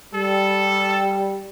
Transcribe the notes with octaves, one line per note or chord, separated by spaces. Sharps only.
G3 A4